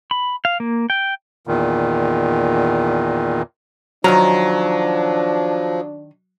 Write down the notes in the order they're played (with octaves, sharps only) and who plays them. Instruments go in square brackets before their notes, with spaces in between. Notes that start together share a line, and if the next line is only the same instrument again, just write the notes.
[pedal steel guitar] B5
F5
A#3
G5
[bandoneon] E2 A#2 D#3
[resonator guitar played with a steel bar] D#3 A#5 [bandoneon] F3 [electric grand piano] F#3 [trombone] D4